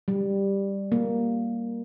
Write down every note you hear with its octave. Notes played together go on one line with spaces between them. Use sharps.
G3
A#3